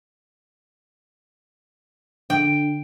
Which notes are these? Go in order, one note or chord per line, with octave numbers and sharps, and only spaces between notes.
D3 G5